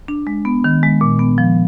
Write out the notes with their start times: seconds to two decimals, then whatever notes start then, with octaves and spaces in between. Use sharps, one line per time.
0.08 D4
0.27 G#3
0.45 B3
0.64 D#3
0.83 G#3
1.01 A#2
1.19 B3
1.38 F3